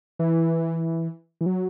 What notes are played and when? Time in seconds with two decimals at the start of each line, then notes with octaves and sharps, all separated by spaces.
0.19 E3
1.41 E3
1.46 F#3